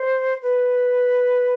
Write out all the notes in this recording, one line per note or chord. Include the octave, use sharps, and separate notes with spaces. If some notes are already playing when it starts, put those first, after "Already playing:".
Already playing: C5
B4